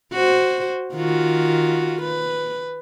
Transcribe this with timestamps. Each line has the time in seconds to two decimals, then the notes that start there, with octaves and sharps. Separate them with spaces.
0.12 F#4 C5
0.94 D#3 F4 F#4
2.02 B4